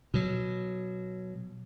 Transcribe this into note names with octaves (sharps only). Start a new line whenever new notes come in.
B2 F#3